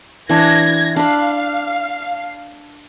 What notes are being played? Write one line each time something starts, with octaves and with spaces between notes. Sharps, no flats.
E3 D4 G#6 A#6
D4 F5 B5